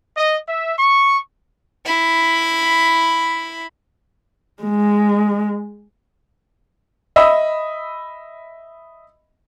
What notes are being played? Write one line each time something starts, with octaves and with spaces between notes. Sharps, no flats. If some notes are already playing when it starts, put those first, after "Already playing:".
D#5
E5
C#6
E4 B5
G#3
D#5 E5 B5 D#6 E6